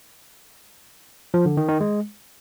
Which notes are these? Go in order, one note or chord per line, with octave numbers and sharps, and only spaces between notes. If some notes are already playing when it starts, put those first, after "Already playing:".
F3
D3
D#3
D#3
G#3